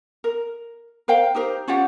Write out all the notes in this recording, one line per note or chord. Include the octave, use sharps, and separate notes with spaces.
A#4
A#4 C5 F5 G5
D#4 G4 A#4 C5
C#4 F4 G4 F#5